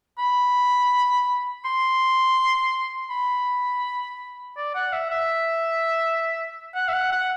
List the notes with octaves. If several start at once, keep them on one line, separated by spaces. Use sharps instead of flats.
B5
C6
B5
D5
F#5
E5
E5
F#5
E5
F#5
F#5